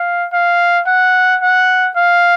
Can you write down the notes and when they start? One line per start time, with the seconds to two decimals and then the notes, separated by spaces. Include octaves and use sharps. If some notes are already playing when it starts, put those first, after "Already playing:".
Already playing: F5
0.33 F5
0.87 F#5
1.41 F#5
1.96 F5